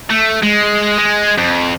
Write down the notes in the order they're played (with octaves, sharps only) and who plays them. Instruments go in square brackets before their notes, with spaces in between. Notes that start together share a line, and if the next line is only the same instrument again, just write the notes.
[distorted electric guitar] A3
G#3
G#3
F2